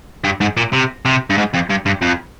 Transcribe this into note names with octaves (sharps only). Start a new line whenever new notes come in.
G2
G#2
A#2
C3
C3
G2
G#2
F2
G2
G2
F2